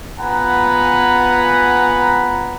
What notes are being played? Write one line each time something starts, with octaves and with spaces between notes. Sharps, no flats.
B3 F4 F#5 G#5 A#5 B5